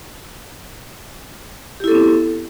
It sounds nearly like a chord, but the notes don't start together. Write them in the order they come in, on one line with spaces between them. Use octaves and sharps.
G4 E4 A4 B3 C4